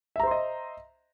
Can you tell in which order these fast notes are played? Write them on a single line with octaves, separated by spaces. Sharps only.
E5 A#5 C5 C6 D#5